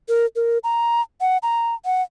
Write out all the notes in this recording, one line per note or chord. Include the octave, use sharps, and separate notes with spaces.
A#4
A#4
A#5
F#5
A#5
F#5